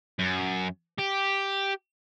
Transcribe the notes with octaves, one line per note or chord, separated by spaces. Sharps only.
F#2
G4